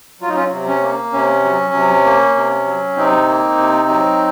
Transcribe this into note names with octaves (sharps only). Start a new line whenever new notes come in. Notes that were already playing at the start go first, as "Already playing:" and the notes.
F#3 F4
D#4
C#4 F4
C3
C#4
A#3
C3 C#4
F#3
C3
A#3
C3
F#3
C3 C4 D#4
A#3
C3
F#3